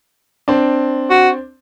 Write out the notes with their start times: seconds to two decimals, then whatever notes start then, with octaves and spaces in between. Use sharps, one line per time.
0.48 C4 D4
1.10 F#4